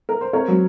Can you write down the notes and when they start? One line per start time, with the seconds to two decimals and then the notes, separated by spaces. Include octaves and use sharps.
0.09 A#4
0.21 C5
0.33 C4 A#4 C#5
0.48 F#3